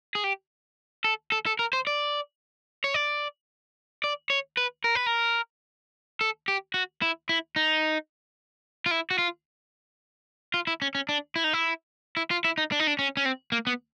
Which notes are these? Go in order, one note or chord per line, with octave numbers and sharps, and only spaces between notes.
G#4
G4
A4
A4
A4
A#4
C5
D5
C#5
D5
D5
C#5
B4
A#4
B4
A#4
A4
G4
F#4
E4
E4
D#4
F4
E4
F#4
F4
F4
E4
C#4
C#4
D4
E4
D#4
E4
E4
F4
E4
D#4
D4
D#4
D4
C#4
C#4
C4
A#3
B3